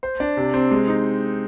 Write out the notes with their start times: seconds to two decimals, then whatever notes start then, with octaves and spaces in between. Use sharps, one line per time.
0.03 C5
0.20 D4
0.37 C3
0.54 C4
0.71 G#3
0.88 D#4